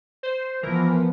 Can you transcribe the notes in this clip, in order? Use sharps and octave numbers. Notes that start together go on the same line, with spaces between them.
C5
E3 F3 B3 A#4